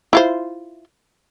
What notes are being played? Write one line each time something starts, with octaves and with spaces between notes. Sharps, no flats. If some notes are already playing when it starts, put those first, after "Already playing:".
E4 F4 C5